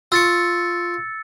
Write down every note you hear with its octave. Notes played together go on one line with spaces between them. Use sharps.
F4 C#6 E6 A6 C#7